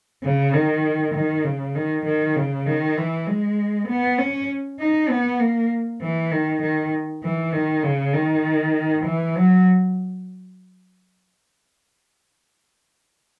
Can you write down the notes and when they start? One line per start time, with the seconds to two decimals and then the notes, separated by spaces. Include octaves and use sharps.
0.23 C#3
0.54 D#3
1.15 D#3
1.44 C#3
1.75 D#3
2.05 D#3
2.36 C#3
2.66 D#3
2.97 E3
3.27 G#3
3.88 B3
4.18 C#4
4.79 D#4
5.10 B3
5.40 A#3
6.02 E3
6.32 D#3
6.62 D#3
7.23 E3
7.53 D#3
7.84 C#3
8.14 D#3
9.06 E3
9.36 F#3